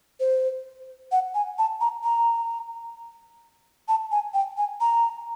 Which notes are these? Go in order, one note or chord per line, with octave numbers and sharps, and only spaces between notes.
C5
F#5
G#5
A5
A#5
A#5
A5
G#5
G5
G#5
A#5